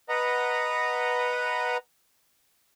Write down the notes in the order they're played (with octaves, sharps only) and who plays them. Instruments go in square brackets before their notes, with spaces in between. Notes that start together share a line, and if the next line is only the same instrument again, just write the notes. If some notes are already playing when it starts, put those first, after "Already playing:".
[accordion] B4 D#5 F#5 A#5